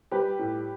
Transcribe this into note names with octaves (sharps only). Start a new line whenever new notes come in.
G3 G4 B4
A2